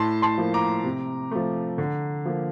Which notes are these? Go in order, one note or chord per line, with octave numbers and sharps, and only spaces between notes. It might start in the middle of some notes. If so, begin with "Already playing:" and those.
Already playing: A2 A5 C6
A5 C6
F3 A#3
A#5 D6
C3
F3 A3
D3
F3 A#3